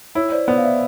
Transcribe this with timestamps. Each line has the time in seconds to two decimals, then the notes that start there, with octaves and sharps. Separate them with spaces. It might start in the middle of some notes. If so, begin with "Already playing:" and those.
0.15 E4 C#5
0.32 C5 D5
0.48 B3 C5 D5
0.58 F5
0.64 D5 E5